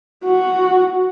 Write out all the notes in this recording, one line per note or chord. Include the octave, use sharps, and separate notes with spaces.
F#4